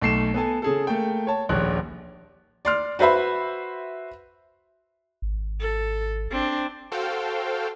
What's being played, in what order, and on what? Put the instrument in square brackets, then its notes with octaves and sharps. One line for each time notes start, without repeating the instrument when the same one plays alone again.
[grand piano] B1 A3 C7 E7
B3 A4 G#5 A5
C#3 G#4 A4
A3 A#3 G5
C#5 A5
D#1 A#1 C#5 F#6
[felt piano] D5 C6 F6
F#4 B4 C5 E5 B5
[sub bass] G#1
[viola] A4
C4 D4
[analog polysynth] F#4 A4 C5 F5 G5